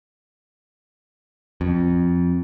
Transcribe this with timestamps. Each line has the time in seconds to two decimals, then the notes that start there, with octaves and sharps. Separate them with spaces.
1.61 F2